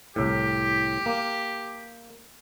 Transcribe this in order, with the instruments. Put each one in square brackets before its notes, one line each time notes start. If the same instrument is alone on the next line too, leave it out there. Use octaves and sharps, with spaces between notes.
[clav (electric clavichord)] C2 A2 [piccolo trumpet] G4
[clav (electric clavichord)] A#3